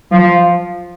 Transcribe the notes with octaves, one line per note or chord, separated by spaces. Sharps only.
F3